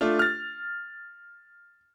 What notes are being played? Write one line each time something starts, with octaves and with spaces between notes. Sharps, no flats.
A3 D4 F4
F6 A6